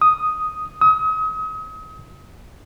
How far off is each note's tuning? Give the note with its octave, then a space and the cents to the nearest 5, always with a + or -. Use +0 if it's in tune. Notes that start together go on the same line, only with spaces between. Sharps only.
D#6 +5
D#6 +40